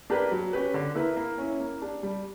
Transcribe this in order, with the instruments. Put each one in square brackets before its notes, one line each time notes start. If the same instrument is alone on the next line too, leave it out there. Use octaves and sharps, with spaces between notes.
[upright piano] A#3 D4 G4 B4
F#3
C#4 G4 B4
D3
A#3 E4 B4
A#3
C#4 E4
A#3
D4 G4
G3